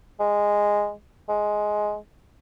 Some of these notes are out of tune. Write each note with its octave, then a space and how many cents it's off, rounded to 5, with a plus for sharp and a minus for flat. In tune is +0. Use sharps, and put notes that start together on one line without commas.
G#3 -10
G#3 +10